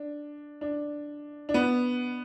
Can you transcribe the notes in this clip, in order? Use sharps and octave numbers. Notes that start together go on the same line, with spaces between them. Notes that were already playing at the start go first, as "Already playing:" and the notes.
Already playing: D4
D4
D4
B3